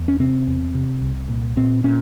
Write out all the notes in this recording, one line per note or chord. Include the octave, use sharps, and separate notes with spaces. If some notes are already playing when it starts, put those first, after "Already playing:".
Already playing: E2
C#4
C3 C4
E2
C3
C2
A#2
A#2 C4
A#2 C#4